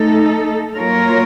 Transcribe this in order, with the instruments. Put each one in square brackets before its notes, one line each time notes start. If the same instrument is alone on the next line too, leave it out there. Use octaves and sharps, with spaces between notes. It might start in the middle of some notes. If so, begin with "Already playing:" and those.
Already playing: [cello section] A3 D#4 A4
F#3 A#3 F4 A#4 C#5